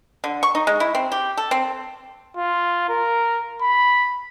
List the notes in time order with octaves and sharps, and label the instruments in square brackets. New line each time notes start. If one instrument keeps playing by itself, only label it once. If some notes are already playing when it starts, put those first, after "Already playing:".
[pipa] D3
C#6
D#4
G#3
E4
C4
G4
A4
C4
[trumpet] F4
A#4
B5